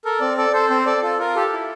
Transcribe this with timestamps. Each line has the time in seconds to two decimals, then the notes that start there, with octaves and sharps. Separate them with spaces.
0.05 A4 A#4
0.20 C4 D5
0.37 A4 D5
0.53 A4 C5
0.70 C4 C5
0.86 A4 D5
1.03 F4 A4
1.19 F4 A#4
1.36 G4 A4
1.53 E4